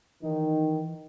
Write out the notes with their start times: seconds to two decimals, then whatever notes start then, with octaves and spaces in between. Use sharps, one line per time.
0.23 D#3 E3 D#4